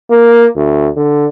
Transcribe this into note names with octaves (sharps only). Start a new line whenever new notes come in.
A#3
D2
D3